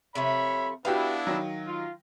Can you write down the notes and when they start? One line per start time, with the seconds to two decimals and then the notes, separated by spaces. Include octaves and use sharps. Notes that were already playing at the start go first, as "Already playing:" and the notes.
0.15 C3 F3 A3 C#5 E5 B5
0.85 B3 D4 E4 F#4 G4 B4 F5
1.27 D#3 F#3
1.67 F4